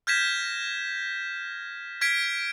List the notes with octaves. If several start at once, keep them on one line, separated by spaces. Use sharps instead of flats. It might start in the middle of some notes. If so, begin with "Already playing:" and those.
F6 G6 G#6 A#6 B6 E7
F6 G#6 B6 C7 D7